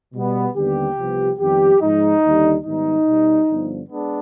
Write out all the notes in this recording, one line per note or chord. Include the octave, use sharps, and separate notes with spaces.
B2 G3 B3
D#2 D3 G3 B3 G4
C2 C3 F3 B3
F2 D#3 G3 B3 G4
G#2 F3 G#3 D#4
D#2 D3 G3
G#2 D#3 G3 B3 D#4
B2 G3 B3
G2 D3 F3 B3
G#3 B3 D4